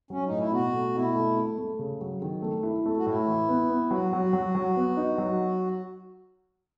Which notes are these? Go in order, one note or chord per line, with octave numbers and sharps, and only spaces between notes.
F#3 C#4
D#4
A2
E4
B2 F#4
A3
B2 E4
A3
A3
A3
C#3
F#3
D#3
A3
E4
A3
F#4
A2 E4
E3
B3
B3
F#3 F#4
F#3
F#3
F#3
B3
D#4
F#3